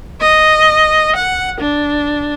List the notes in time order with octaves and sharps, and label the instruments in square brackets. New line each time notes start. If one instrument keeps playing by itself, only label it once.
[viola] D#5
F#5
D4